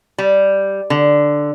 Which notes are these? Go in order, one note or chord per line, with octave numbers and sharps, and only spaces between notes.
G3
D3